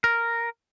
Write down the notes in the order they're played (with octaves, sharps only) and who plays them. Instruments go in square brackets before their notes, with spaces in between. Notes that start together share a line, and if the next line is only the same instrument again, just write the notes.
[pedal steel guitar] A#4